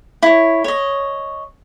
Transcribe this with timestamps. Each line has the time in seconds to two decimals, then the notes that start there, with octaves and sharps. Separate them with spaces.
0.23 E4 C#5
0.64 C#5 D#5